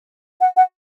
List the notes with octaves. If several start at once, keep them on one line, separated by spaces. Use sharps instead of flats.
F#5
F#5